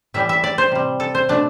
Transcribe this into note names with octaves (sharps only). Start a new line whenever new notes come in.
A2 E3 G3 E5
E5
D5
C5
C3 G3
A4
C5
B2 A3 D4